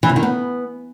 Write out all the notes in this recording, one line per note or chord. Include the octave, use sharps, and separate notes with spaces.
E3
C3
D#3
B3